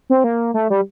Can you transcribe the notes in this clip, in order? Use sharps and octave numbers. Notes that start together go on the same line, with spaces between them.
C4
A#3
A3
G3